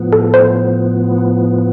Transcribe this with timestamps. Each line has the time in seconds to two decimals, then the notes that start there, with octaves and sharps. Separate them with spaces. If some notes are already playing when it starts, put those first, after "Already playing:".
Already playing: A2 F3 B3
0.13 A4
0.34 C5